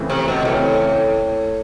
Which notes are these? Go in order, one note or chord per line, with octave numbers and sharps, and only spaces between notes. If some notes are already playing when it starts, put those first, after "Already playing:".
Already playing: C#3 E3 A3 C4
C3
B2
A2 C#3 E3 A3 C4